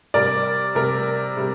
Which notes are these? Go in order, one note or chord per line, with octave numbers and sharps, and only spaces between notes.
C3 G3 A#4 D5
C3 G3 A#4
C3 G3